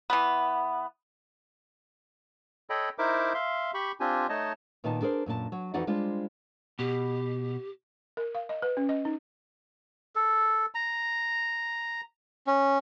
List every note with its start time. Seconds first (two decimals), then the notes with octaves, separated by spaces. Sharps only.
0.10 E3 B3
2.70 A4 C#5 D#5 G5 B5
2.98 D#4 E4 A#4 C5 E5 D6
3.34 E5 F5 C6
3.74 G4 B5 C#6
4.00 C4 D4 F4 G4 G#5
4.29 A3 D#4 C#5 D#5 A5
4.84 A#2 D#3 B3 D#4 A5
5.01 D4 G#4 A#4 C5
5.26 F#2 A#2 F#4 A5
5.52 F#3
5.74 F2 E3 D#4 F#4 D5 F#5
5.87 G3 G#3 D4 F4 C5
6.79 B2 G4
8.17 A#4
8.35 F5
8.49 D#5
8.62 B4
8.77 C#4
8.89 D#5
9.05 D#4
10.16 A4
10.75 A#5
12.47 C#4